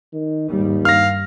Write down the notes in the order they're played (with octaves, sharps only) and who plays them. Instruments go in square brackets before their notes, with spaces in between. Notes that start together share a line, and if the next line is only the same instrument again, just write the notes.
[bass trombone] D#3
[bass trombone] D#2 [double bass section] G#2 G3
[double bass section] G2 [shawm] F5 [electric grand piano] F6 A#6